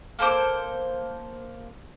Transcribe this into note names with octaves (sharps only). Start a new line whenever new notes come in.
A#3 A4 C5 D6